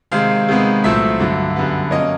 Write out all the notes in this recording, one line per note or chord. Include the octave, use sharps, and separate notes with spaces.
C3 D#3 G#3 C4 F5
C3 D#3 G#3 B3
C2 A#2 F#3 A3 C4 E5
G2 D3 F#3
F#2 D3 G3 B3
B2 F#3 A#3 C#4 D#5